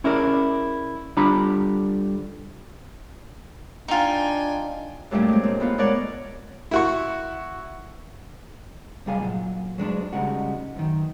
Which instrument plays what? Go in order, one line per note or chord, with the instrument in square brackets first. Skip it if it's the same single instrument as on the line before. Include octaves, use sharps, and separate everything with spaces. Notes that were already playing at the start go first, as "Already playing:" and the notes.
[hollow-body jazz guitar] C#4 E4 G#4 A#4 D5
D3 G3 D4 F4 A#5 B5
[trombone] D4 [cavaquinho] D#4 F4 [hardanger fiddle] G5 G#5
[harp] F#2 A#2 G3 A3 C#4 D4
G#3 C4
A#2
A2 B3 F4
G#3 A3 A#4 C#5 D5 F#5
[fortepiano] E4 F#4 C#6
[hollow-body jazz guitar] B1 C3 G3 G#4 F5 G#5
A#2 F#3
F#3 G#3 D4
C#3 G3 G#3 D#4 F#4
F#2 D#3